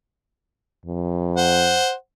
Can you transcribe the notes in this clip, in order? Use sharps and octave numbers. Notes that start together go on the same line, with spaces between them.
F2
C5 F#5